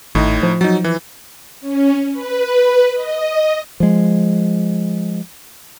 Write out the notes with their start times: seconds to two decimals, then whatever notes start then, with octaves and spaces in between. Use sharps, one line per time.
0.15 G#1 A2 D#4
0.43 F3
0.61 F#3 D#4
0.84 E3
1.61 C#4
2.12 B4
2.94 D#5
3.80 F3 G#3